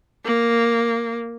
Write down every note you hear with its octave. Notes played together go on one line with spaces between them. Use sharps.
A#3